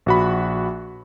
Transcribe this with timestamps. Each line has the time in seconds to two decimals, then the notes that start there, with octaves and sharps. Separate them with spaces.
0.06 A#1 F#4 B5